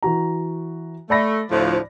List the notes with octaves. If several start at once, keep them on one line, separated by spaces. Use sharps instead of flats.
E3 F#4 A#5
A3 D5 B5 A#6
D2 A2 F3